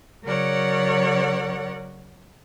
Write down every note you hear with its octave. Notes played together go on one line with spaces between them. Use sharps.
C#3 F#3 A#4 C#5 D5 F#5